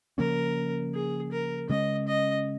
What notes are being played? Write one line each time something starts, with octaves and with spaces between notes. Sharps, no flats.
C#3 F3 A#3 C#4 A#4
G#4
A#4
C#3 G#3 C#4 D#5
D#5